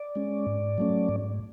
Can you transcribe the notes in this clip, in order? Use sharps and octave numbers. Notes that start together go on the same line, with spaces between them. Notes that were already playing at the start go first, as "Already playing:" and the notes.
Already playing: D5
G#3 C#4
G#2
F#3 A3 C#4
G#2